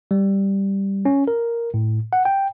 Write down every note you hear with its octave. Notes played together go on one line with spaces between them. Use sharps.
G3
C#4
A#4
A2
F#5
G5